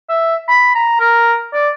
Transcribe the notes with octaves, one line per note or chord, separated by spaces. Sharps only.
E5
B5
A#5
A#4
D5